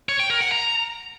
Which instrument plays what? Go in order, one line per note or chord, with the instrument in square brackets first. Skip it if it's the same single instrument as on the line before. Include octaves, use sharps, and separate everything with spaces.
[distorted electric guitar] C#5
G5
A#4
F#5
A#5